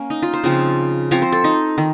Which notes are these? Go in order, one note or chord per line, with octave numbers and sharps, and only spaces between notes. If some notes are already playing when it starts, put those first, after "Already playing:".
Already playing: A#3 C#4
D#4
F4
C5
C#3 F3 C4
F3 C4 C#5
C5
A4
D#4
D#3